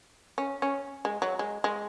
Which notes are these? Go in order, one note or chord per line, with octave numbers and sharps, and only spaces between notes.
C#4
C#4
G#3
F#3
G#3
G#3